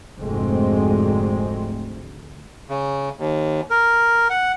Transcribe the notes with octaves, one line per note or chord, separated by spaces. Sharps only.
F1 D2 G#2 G#3 C4
C#3
D#2
A#4
F#5